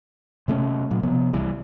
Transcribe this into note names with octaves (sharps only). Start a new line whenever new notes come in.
C3 A3 C4 C#4
A#2 F#3
C3 F3 B3
C2 E3 G3